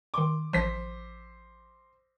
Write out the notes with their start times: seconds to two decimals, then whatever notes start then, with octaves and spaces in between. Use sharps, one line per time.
0.14 D#3 C6 D6
0.53 A1 F3 C5 B6